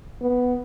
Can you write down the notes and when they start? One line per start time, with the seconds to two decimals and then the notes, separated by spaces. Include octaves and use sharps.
0.21 B3